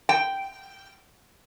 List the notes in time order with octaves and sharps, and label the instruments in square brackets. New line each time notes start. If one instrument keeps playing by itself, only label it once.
[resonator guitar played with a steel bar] G5